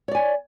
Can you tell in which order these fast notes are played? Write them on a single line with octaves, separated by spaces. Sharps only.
C#5 D5 G#5